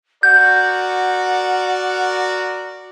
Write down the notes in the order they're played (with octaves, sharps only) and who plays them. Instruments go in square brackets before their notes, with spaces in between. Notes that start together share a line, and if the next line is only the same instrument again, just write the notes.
[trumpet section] F#4 A#4 D5 [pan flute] F#5 [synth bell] G6